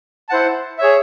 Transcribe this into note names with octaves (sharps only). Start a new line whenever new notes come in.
E4 C5 F#5 A5
G#4 C#5 E5